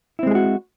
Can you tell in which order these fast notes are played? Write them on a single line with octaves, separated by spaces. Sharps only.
E4 C4 G#3 G#4 F#4